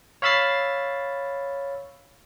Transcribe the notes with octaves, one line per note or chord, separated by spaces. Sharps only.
C#5 F5 B5 E6 A6 C7